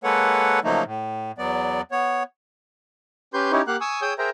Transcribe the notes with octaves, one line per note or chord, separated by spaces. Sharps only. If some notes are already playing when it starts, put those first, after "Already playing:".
G#3 A#3 A4 B4 C#5 F#5
C#3 F3 F#3 A3 A#3 D#4
A2
E2 F#3 B3 D5
B3 C#5
C#4 G4 B4 C6 G6
C#4 D#4 E4 G4 C#5
A#3 G4 F5 F#5 F#6
G#5 C#6 D#6 E6
G#4 C#5 G5 D#6 E6 G6
G#4 A#4 C5 E5 G5 A#5